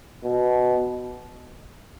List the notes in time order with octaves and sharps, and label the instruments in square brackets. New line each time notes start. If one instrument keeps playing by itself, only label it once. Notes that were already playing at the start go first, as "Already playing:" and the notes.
[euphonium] B2